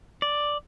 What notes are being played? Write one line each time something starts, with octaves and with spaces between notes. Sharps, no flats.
D5